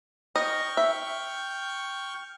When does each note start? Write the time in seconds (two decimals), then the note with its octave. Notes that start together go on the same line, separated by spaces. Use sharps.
0.36 D#5 G5 C#6 F6
0.77 E5